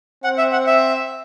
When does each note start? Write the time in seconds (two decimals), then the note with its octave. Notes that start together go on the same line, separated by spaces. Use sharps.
0.24 C4 F#5
0.38 E5
0.52 F#5
0.67 E5